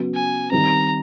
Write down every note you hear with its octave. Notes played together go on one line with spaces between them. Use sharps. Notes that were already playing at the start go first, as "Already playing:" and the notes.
Already playing: C#3 F#3 B3
G#5
D#3 G3 C4 A#5